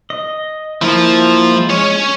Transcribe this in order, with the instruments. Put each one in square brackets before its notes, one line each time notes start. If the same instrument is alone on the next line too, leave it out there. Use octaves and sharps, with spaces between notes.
[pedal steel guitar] D#5
[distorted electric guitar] F3 [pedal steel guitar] A#3 E4
[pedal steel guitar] G#3
[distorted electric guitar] C#4 C#5